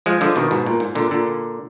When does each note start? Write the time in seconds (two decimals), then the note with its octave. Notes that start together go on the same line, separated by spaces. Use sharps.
0.06 F3 G#3
0.21 D3 F3
0.36 B2 D#3
0.51 G#2 B2
0.66 A#2
0.80 G#2
0.95 A#2 D3
1.11 A#2 D3